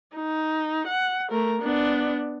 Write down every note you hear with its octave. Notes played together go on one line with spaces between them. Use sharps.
D#4
F#5
A3 A#4
B3 D4